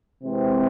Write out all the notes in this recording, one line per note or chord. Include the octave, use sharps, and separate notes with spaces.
C3 E3 G#3 C4